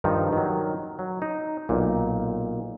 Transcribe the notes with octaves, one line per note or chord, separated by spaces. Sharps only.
G2 D#3 F3 D#4
D#3 F#3
F#3
D#4
B1 A#2